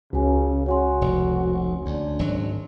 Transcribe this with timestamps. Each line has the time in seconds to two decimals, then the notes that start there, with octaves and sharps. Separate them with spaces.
0.13 C#2 C#3 F#4 G#5
0.66 F#4 C#5 G#5 C6
1.01 F1
1.86 D2 D4
2.19 G#1 F#3